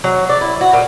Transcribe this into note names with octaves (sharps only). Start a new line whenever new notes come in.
F#3
D5
E4
F#4
A#2